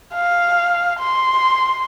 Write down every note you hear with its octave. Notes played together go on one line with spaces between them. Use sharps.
F5
C6